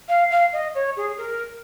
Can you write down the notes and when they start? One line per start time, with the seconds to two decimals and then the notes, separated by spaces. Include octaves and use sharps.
0.08 F5
0.30 F5
0.52 D#5
0.74 C#5
0.96 G#4
1.17 A#4